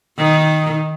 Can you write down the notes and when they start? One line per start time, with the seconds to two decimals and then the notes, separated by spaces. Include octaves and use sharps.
0.18 D#3